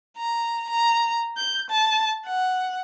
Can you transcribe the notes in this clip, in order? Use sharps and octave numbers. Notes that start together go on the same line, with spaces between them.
A#5
A#5
G6
A5
F#5